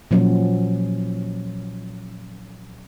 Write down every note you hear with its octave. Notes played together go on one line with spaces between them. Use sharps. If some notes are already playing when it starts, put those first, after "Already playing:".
A#2 F3 F#3 C#4